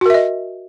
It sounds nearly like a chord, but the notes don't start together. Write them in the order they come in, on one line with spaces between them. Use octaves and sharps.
F#4 A#4 E5 D#5